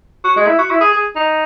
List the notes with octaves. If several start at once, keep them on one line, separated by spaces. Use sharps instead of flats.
F#4
G#3
E4
F#4
E4
G#4
G#4
D#4